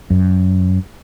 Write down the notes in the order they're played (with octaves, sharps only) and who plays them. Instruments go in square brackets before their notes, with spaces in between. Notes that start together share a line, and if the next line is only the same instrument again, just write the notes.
[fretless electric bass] F#2